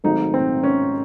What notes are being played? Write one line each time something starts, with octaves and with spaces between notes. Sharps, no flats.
G#1 G#2 F#3 A3 D#4
C4
C#4